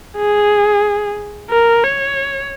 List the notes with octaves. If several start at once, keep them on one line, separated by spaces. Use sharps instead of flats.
G#4
A#4
C#5